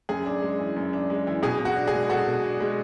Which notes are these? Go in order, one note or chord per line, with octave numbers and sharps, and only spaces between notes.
F#2 G#4
D4
G#3
E3
F#2
D4
G#3
E3
B2 G#4
B2
F#4
D4
G#4
G#3
B2 F#4 A4
B2
D4
G#3